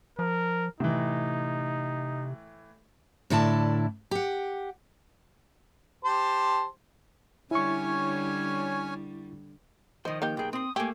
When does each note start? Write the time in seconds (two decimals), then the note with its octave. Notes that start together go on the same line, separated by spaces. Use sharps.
0.19 F3 A#4
0.80 A2 C3 E3 D#4
3.30 A2 D3 E4 D5 A5
4.11 G4 F#5
6.04 G4 C5 A5
7.51 D3 G3 C#4 E4 C#5 G#5 C#6
10.05 D#3 F3 C5 D#5
10.22 A#3 D#4 G4 G6
10.37 B1 G#4 G5
10.53 C4 C6 D#6
10.76 A3 A#3 G4 G#5